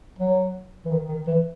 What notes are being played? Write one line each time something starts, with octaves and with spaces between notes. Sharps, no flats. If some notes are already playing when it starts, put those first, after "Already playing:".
F#3
E3
D#3
D#3
E3